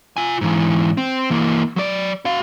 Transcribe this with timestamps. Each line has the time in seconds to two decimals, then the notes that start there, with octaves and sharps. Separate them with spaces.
0.17 F4 G#5
0.41 G#2 E3
0.97 C4
1.30 E3 A#3
1.76 F#3 D5
2.25 F#4 F5